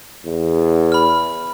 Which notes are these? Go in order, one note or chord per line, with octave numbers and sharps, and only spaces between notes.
E2
B5 F6